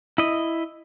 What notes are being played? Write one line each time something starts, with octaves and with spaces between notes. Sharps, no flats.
E4 D#5